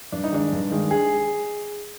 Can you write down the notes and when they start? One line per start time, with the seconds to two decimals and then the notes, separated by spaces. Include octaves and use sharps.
0.12 G2 D4
0.24 D#4
0.32 D#3 G#3 D4
0.53 G2
0.72 D#3 G#3
0.91 G#4